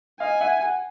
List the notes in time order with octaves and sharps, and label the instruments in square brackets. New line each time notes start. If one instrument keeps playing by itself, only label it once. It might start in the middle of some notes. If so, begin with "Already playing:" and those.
[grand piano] D#5 F5 [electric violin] G#5
[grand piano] E5 F#5
F#5 G#5